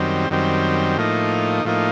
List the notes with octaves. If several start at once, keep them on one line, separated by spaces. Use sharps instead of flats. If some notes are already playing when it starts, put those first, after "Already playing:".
Already playing: F#2 D#3 G3 C4
F#2 D#3 G3 C4
A2 F3 A#3 D#4
A2 F3 A#3 D#4